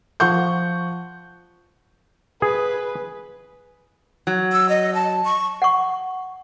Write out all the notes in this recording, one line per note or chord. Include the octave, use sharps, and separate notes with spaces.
F3 F#5 C#6 G6
G#4 B4
F#3
E6
D#5
A5
C#6
F#5 C#6